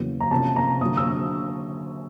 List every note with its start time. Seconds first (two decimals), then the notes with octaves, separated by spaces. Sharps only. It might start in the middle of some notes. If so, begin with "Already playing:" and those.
Already playing: E2 C#3 F#3 A#3
0.20 A#5
0.30 C3 F3 A#3 C#4 A5
0.56 A#5
0.81 D3 F#3 A#3 D#6
0.97 E6